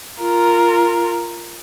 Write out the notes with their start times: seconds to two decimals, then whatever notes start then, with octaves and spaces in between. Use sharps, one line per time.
0.20 F4 A#4